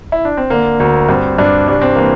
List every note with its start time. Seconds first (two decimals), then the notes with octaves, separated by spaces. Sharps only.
0.12 E4
0.25 D4
0.37 C4
0.50 D3 A#3
0.80 D2 A#3
1.09 G2 C4
1.38 G2 D4
1.68 C2 D4
1.82 C4
1.95 E3 A#3